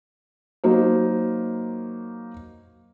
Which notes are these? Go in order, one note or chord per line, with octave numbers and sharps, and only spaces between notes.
F#3 A#3 D#4 C5